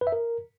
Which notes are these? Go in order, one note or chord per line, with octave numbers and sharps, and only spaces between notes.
B4
E5
A#4